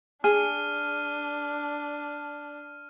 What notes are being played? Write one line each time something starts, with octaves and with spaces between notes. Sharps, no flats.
D4 G#4 F6 D#7